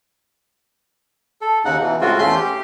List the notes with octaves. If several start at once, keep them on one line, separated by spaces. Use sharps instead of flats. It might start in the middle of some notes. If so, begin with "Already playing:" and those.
A4
D#2 C#3 D#4 F#5
B2 E3
A2 C#3 G#3 C4 F4 F#4
E2 A3 C#4 C6 G6
G4